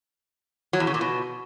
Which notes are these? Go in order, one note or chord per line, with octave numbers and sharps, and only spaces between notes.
F#3
E2
C#3
A#2
B2